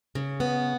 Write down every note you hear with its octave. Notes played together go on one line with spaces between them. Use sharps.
C#3
B3